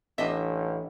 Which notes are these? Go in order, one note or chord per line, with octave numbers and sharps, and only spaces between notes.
A1 D4 D#5 E5